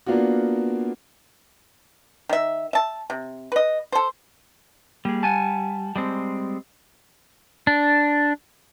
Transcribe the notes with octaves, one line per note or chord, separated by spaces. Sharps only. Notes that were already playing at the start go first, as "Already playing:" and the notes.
A#3 B3 D4 F4 F#4
D#3 E5
E5 A5
C3
B4 D#5
A4 C5
G3 A#3 G#4
F#5 G#5 A5
G3 G#3 C4
D4